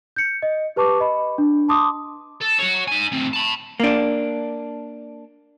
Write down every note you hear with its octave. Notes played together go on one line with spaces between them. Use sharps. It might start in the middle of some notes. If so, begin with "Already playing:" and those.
G6 C#7
D#5
G4 B4 A5 C#6 D6
D#5 B5
D4
A5 C6 D6 D#6
A4
F#4 C#5
D#4 G#5
A2 C4
A5 B5
A#3 D4